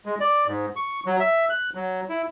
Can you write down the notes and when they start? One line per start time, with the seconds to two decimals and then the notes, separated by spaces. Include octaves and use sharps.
0.06 G#3
0.20 D5
0.48 G#2
0.76 C#6
1.06 F#3
1.20 E5
1.50 F#6
1.75 F#3
2.09 E4